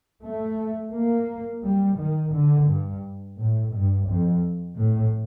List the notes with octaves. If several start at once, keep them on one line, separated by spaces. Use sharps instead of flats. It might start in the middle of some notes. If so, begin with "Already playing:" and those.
A3
A#3
G3
D#3
D3
G2
A2
G2
F2
A2